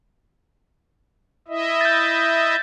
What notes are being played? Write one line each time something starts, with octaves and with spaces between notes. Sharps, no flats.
E4 D#5 E5
G6 A6